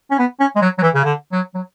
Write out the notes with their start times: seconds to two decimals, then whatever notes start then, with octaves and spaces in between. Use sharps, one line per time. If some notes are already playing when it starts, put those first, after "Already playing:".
0.11 C#4
0.19 B3
0.40 C#4
0.56 G#3
0.62 F#3
0.78 F#3
0.83 E3
0.95 C#3
1.04 D3
1.32 F#3
1.54 F#3